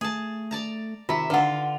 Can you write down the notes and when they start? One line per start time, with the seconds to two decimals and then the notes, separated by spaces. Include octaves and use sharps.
0.01 A3 G#4 A5
0.51 D5 A5 A#5
1.09 C3 D#3 F4 E5
1.30 D3 F4 B4 F#5